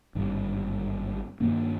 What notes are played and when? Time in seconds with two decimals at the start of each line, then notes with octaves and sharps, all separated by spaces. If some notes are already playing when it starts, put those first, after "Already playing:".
0.15 G#1 G2 D3
1.40 G2 D#3 A#3 D4